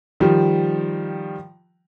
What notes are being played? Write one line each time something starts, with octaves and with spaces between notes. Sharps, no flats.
D#3 F3 G3